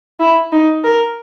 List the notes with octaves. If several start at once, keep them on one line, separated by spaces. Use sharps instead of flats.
E4
D#4
A#4